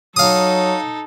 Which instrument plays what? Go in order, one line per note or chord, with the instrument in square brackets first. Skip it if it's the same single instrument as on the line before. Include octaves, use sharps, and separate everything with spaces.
[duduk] F#3 [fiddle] D#4 A4 [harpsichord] F5 D#6